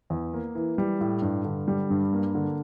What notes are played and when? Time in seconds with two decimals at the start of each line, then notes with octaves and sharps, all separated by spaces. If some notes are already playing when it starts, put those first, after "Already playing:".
0.10 E2
0.34 A#3
0.55 E3
0.78 G3
1.01 A2
1.22 G2
1.45 D3
1.68 G3
1.90 G2
2.13 A#3
2.35 D3